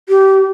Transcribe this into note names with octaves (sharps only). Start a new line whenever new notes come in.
G4